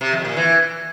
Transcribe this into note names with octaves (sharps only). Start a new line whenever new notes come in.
C3
F2
A#2
E3